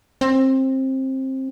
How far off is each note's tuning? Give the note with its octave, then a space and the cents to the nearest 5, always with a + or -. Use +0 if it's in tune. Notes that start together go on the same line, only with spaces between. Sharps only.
C4 +20